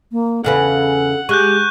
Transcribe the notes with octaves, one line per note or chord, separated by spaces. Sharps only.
A#3
E2 C#3 A4 B4 F#5
G#3 G4 C#6 F#6 G6